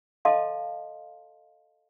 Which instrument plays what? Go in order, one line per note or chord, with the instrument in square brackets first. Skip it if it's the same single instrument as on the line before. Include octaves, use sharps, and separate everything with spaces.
[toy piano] A4 D#5 F5 A5 C6